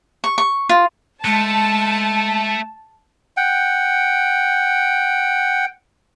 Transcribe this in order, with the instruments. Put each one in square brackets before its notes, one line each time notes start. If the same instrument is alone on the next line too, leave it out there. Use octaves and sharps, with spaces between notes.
[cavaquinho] C#6
C#6
F4
[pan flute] G#3 [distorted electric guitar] A3 [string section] A5
[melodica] F#5 G5